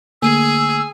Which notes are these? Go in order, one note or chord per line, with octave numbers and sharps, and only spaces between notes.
D3 A3 A#3 G#4 G#5 E6